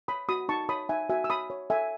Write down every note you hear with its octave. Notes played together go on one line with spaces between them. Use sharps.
C#5 B5 D#6
F#4 B5 D#6
D#4 A5 C#6
C#5 B5 D#6
D#4 E5 G#5
F#4 E5 G#5
E6
C#5 B5 D#6
C#5
A4 E5 G#5